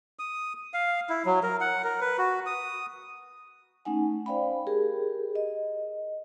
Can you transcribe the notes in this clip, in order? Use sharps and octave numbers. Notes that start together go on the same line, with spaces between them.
D#6
F5
E4
F#3
A#4
F#5
A#4
B4
F#4
D#6
A3 C#4 D#4 F#5 G#5
C5 D5 F5 G5 B5
G4 G#4 A#4
D#5